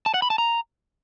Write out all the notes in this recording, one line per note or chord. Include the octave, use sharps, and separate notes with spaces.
A5
F#5
B5
A5
A#5